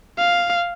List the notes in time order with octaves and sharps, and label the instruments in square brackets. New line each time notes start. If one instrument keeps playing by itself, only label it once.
[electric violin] F5